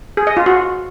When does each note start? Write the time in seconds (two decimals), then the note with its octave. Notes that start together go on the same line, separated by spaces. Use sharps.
0.17 G#4
0.27 D#5
0.37 F4
0.46 F#4